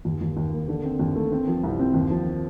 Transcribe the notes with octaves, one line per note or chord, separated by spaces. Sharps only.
D#2
D#2
D#2
A#3
D3
C4
D#2
A3
C4
F3
C2
C4
D#2
F3